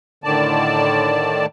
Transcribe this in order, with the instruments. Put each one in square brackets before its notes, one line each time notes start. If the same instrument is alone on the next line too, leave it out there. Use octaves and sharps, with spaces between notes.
[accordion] A2 D3 D#3 D5 A5